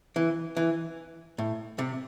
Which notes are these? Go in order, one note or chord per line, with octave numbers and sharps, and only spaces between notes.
E3
E3
A2
C3